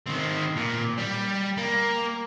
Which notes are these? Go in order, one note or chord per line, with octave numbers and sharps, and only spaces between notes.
D#3 C4
A#2
G3
A#3